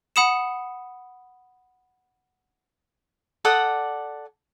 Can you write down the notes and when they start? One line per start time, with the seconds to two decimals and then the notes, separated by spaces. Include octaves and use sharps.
0.16 F#5 B5 D#6 C#7 E7
3.45 A4 D5 F#5 D#6